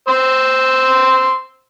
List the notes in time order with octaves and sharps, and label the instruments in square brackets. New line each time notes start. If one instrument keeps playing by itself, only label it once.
[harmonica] C5 C6 E6